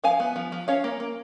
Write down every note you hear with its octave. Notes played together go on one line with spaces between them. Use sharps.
F3 F5 G#5
B3
F3
F3
C#4 C#5 F5
A#3
A#3